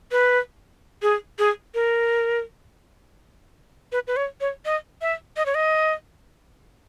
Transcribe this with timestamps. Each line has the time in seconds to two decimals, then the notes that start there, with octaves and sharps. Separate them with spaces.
0.11 B4
1.02 G#4
1.39 G#4
1.74 A#4
3.92 B4
4.07 B4
4.17 C#5
4.41 C#5
4.65 D#5
5.01 E5
5.37 D#5
5.46 C#5
5.55 D#5